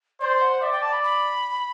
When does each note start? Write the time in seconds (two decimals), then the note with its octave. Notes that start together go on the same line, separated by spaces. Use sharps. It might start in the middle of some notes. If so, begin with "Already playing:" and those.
0.20 C5 D5
0.41 F#5
0.62 D5 E5
0.72 G5
0.82 A5
0.93 B5
1.03 B5